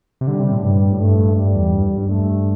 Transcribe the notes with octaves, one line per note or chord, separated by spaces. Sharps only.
C3
D3 G3
C3
A2
G2 G3
A2
G2 A3
G2
G2 G3
E2
G2
G2
G2 A3